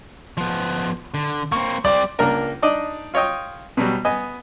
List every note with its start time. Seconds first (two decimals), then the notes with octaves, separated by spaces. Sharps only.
0.37 F3 B3
1.14 D3
1.52 A#3 C4 C#6
1.85 G3 C4 D5
2.19 C#2 A#3 D4 A#4 A#5
2.62 D4 D#4 D5 D#5
3.14 F4 C#5 D#5 G5 D#6
3.77 B2 F#3 G3
4.05 B3 D#5 G#5